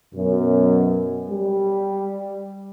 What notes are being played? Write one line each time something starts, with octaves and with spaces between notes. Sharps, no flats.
F#2 B2
G3